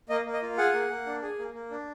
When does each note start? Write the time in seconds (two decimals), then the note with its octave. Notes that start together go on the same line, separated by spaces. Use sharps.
0.09 A#3 D#5
0.25 A#3
0.34 D#5
0.42 F4
0.58 G#4 F#5
0.73 A#3
0.89 A#3
1.06 D4
1.22 G#4
1.38 A#3
1.54 A#3
1.71 D4